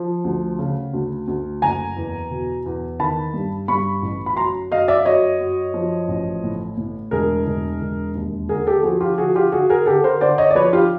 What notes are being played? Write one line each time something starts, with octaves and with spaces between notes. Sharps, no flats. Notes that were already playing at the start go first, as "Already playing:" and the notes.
Already playing: F3
D2
C#3
D2
D2
F#1 G#5 A#5
E2
B2
E2
D#3 A5 B5
G2
G2 B5 C#6
A1
B5
F#2 A#5 C6
F#2 D#5 F5
D5 E5
F#2 C#5 D#5
F#2
F3
A1
A2
A2
E1 G#4 A#4
E1
E1
D#2
D3 G#4 A#4
G4 A4
F3 F#4 G#4
F4 G4
D3 F#4 G#4
F4 G4
D3 F#4 G#4
G#4 A#4
D3 G4 A4
A#4 C5
D3 C5 D5
C#5 D#5
D5
F3 B4 C#5
F4 G4